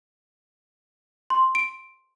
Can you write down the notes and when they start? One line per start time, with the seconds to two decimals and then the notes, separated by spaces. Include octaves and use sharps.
1.30 C6
1.55 D7